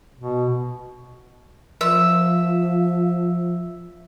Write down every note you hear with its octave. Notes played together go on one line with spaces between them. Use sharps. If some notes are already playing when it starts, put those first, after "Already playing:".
B2
F3 E5